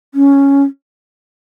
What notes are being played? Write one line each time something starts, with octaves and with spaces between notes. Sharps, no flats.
C#4